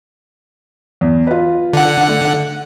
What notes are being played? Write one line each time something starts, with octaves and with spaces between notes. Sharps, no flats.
E2
F4 B4
D3 F#5
A3